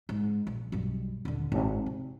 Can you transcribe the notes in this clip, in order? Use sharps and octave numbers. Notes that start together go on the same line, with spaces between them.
G#2
A#1
B1 G2
D#1 D3
G#1
C3